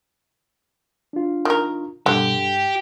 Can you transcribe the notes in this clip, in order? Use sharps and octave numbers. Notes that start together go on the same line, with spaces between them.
D4 F4
D#3 A#4
G2 B2 D3 G3 G4
G2